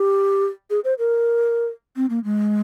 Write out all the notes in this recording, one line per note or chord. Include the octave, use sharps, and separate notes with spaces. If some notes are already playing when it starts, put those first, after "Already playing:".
Already playing: G4
G#4
C5
A#4
C4
A#3
G#3